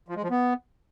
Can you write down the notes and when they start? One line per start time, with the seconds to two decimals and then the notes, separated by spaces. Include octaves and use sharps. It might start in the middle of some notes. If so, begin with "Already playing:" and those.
0.08 F3
0.16 G#3
0.23 F3
0.31 B3